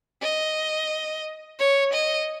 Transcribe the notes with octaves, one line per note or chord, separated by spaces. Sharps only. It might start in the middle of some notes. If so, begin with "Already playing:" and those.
D#5
C#5
D#5